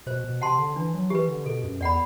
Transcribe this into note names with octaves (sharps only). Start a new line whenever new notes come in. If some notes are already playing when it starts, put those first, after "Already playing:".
B2 C5
B2
C3 F#5 A5 C6
D3
E3 D4
F#3
E3 G4 B4
D3
B2 A4
F#2
E2 D5 F#5 B5